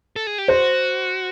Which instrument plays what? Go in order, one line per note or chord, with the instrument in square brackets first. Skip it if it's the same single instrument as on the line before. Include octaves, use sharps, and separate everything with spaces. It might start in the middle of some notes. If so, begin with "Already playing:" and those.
[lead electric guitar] A4
G#4
G4
[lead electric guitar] F#4 [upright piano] C5